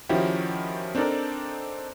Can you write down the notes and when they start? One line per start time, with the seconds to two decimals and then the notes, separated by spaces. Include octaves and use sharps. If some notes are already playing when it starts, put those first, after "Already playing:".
0.09 D#3 F3 C#4 E4 F#4 G4
0.95 C4 D4 D#4 A4 A#4 D5